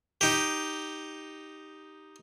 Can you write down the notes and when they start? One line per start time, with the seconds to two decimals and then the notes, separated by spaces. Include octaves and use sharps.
0.21 D#4 G4